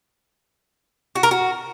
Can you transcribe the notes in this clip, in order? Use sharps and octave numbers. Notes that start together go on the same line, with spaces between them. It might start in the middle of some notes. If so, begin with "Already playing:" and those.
F#4
A#4
F#4